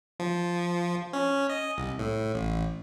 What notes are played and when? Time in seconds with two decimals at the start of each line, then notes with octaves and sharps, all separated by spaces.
0.20 F3
1.13 C#4
1.50 D#5
1.78 C2
1.99 A2
2.35 A1